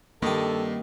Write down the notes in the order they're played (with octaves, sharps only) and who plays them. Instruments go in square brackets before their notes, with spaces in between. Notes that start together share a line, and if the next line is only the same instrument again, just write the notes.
[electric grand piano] G2 [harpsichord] D#3 G4 [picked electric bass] G3 A#3 [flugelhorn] A4